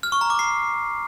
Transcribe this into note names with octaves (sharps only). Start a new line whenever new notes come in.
F6
C#6
A#5
D6
C7